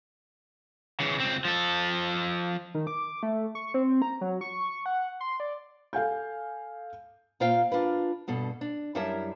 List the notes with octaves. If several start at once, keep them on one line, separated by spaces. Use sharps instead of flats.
C#3 E3
C#2 C4
F3 A4
D#3
D6
A3
C#6
C4
A#5
F#3
C#6
F#5
C6
D5
A4 F5 G#5 G6
A#2 F4 C5 F5 G5
D4 F4 A#4 B4
G2 B2 A4
D4
F#2 G3 E4 A#4 E5 A5